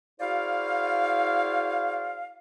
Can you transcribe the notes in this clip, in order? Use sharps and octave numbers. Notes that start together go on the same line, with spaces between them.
E4 F#4 G#4 C5 D5 F5